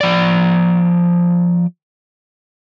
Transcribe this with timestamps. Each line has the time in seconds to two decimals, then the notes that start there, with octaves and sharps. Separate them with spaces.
0.01 F3 D5